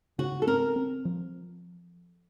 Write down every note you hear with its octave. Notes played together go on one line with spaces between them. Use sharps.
C#3 F#4
A4
C4 A#4
C4
F3